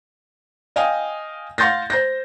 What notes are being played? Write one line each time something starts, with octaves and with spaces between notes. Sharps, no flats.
D#5 F5 G5 G#5 D#6
F5 F#5 C6 G6 A6 A#6
C5 G6 A#6